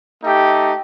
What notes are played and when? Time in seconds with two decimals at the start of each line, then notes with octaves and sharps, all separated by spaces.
0.23 A3 D#4 G4